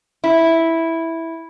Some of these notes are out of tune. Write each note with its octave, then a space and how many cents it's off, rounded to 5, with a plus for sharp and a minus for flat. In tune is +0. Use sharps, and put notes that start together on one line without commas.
E4 -5